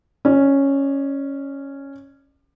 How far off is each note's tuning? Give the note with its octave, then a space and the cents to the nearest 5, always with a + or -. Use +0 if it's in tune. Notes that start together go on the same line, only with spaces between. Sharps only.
C#4 -5 D5 +30